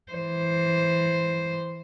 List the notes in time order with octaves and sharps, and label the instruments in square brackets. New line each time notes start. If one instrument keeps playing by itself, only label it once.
[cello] E3 C5